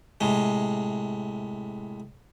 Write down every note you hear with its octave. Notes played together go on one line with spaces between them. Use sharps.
A2 C3 G#3